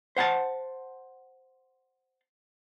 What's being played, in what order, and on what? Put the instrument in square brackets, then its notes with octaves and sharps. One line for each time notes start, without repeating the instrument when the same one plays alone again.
[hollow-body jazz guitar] C5 F#5 G#5 A5